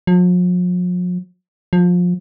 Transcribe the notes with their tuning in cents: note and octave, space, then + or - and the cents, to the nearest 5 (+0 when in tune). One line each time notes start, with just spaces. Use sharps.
F3 +45
F3 +25